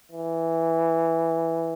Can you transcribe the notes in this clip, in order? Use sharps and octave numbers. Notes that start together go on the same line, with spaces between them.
E3